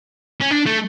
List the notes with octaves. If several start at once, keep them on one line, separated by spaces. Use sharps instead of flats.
C#4
D4
A3